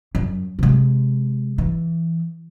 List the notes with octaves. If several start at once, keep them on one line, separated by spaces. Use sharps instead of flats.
F#2
C3 G#3
E3